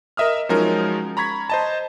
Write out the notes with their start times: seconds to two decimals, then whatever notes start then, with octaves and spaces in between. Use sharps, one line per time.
0.17 A#4 D#5 E5 D#6 F6
0.49 F3 F#3 G#3 C#4 D#4 A#4
1.17 A#5 B5 C#6 G#6 B6
1.50 C5 D#5 A5